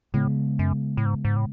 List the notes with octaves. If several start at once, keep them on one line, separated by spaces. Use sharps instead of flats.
A2 C#3 G#3 B3
F#2
A2
G#2
G#2
A2